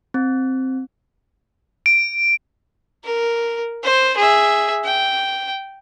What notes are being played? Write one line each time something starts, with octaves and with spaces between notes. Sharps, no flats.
C4
D7
A#4
C5
G#4 E5
G5